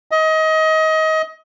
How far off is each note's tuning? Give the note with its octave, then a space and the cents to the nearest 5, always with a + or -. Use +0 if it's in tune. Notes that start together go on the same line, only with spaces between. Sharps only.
D#5 +25